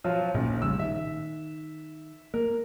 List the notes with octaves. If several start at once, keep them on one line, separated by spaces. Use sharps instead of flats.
F3 F#3 F4
A#1 D#2 A#2 C#4
A1 C#3 G3 E6
D#3 E5
A#3 A#4